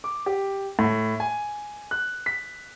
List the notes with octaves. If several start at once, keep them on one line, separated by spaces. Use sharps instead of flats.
D6
G4
A2
G#5
F#6
B6